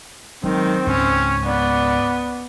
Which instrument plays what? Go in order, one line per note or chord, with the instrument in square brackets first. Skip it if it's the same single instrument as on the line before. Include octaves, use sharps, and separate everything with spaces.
[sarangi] D#3 [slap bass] F#3 G#3 [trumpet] C4
[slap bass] C#2 G#2 [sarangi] C#4
[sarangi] B3 [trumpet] D5